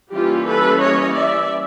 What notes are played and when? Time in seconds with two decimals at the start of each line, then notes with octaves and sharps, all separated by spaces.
0.12 E3 G3 A#3 C#4 F4 G4
0.47 A4 B4
0.81 C#5 D#5
1.16 D5 E5